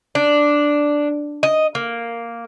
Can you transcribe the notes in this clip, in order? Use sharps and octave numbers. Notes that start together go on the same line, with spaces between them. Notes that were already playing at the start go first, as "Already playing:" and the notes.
D4
D#5
A#3